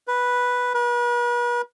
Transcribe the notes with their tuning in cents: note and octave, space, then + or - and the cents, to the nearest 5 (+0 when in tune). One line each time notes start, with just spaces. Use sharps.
B4 -5
B4 -40